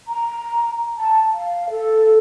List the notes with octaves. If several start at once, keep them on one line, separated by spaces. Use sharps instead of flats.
A#5
A5
F5
A4